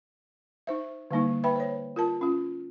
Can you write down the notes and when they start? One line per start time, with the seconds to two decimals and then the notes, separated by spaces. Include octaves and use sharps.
0.67 D#4 C5 E5
1.11 D3 G3 A#3 D#4
1.44 B4 E5 G5 B5
1.56 C5 C#5
1.96 F4 A#4 A5
2.21 C#4 F4